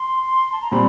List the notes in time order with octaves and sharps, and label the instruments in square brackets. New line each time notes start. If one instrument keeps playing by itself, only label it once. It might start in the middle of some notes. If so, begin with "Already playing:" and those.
Already playing: [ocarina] C6
A5
A#5
[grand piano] A#2 G3 C4 [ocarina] B5